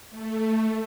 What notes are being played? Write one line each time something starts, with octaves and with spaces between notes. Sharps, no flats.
A3